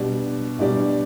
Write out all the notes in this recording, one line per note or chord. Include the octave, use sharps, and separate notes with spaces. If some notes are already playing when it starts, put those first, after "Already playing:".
Already playing: B2 G3 D4 G4 D5
B2 G3 D4 G4 D5